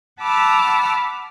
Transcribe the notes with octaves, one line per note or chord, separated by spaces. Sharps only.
F#5 A5 B5 D6 E6 F6